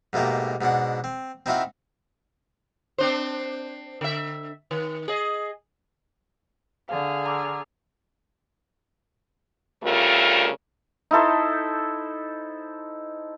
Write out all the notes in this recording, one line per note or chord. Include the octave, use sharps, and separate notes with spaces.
G#2 B2 A3 A#3 G4
G#2 B2 D4 F#5
C4
C4 D#4 E4 F#4 E5 F5
C4 D4 C5
D3 E5
D#3
G#4 D#5
D3 G#4 F5 F6
A#5 D6 E6
D2 C#3 G3 A3 F4 A#4
D#4 E4 A4 C5